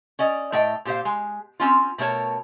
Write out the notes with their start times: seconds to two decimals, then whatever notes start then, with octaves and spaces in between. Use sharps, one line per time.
0.19 C#4 D5 D#5
0.52 A2 A3 D#5 G5
0.85 A#2 G4 C5 F5
1.05 G#3
1.60 C4 C#4 F4
1.98 B2 A3 A#4 C#5 A5